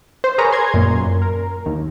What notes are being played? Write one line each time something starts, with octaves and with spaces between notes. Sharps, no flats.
C5
G#4 A#4 B4 C#5 A#5
C6 G#6
F#2 A#2
A#4
D#2